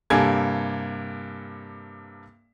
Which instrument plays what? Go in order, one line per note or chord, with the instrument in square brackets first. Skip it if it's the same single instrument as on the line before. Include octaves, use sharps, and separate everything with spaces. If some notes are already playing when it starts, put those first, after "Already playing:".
[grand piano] G2 C3 A#3 A4 G#5 G#6